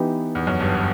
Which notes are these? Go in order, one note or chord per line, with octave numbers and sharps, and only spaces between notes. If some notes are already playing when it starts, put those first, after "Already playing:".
Already playing: E3 B3 D#4 G4
E2
F#2
G1 G2